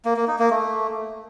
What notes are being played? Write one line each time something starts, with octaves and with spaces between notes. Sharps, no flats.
A#3
A#3
D#4
A#3
A3